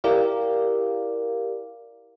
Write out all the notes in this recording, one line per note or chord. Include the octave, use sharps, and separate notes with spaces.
E4 G4 A#4 D5 F5